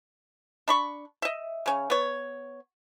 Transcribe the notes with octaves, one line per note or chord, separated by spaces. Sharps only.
D4 B5 C#6
D#5 E5
C#3 C#4
B3 C#5